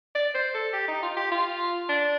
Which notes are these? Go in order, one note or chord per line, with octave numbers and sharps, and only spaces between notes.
D5
C5
A4
G4
D#4
F4
G4
F4
D4